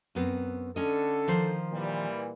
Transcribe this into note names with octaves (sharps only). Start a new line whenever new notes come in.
F#2 B3 C4
D3 C#4 A4 D#5
D#3 F3 C5
A#2 E3 G3